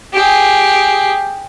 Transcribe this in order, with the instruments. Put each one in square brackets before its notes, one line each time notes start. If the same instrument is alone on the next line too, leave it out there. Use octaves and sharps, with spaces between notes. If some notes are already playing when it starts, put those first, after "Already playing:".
[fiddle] G4 G#4